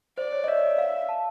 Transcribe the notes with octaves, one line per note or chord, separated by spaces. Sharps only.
C5 D5
C#5
D#5
D5 E5
D#5
F5
A5